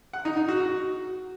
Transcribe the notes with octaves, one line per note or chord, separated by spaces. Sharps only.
F#5
D#4
D#4
F#4
F#4